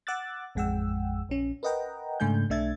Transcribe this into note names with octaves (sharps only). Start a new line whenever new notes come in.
F#5 D6 E6 F#6 A6
A1 F2 G#3 F#5 G5 E6
A#1 C#4
A#4 B4 D#5 F#5 G5 A#5
G#2 C#3 A3 D4 G#5 G6
B1 A3 D4 E5 G#6 A6